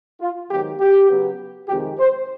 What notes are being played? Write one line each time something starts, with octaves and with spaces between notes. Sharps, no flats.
F4
G#2 D#3 F#3 B3 G4
G4
C#3 F#3 B3
F2 C3 D#3 G#3 G4
C5